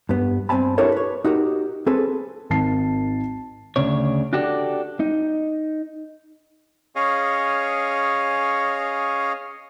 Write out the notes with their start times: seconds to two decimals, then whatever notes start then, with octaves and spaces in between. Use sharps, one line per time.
0.09 G2 B3
0.49 G2 C4 E5 G#5 A5 B5
0.78 D4 E4 G4 A4 A#4 C#5
0.92 B4 C#5
1.25 D#4 F#4 G4 A#4
1.87 C4 G#4 A4 B4
2.50 G#1 D#3 A5 C7
3.76 D2 C#3 D4 C#5
4.33 D4 F#4 G4 A4 D5
5.00 D#4
6.96 C#4 G#4 C#5 D#5 F5